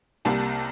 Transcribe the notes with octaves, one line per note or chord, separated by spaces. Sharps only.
C2 C3 G3 A#3 A5